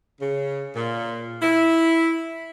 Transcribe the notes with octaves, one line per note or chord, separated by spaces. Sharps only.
C#3
A#2
E4